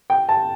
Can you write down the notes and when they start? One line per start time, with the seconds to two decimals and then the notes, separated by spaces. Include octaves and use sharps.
0.10 G5
0.29 A5